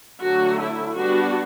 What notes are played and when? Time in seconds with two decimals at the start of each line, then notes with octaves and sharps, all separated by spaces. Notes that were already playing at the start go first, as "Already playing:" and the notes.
0.23 D3 F#3 A3 F#4
0.60 E4
0.96 G3 B3 D4 F#4